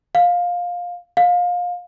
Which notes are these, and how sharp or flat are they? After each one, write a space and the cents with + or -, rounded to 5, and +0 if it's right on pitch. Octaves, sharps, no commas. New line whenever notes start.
F5 +15
F5 +25